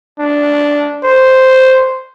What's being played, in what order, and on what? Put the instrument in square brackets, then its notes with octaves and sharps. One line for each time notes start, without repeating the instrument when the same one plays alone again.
[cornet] D4
C5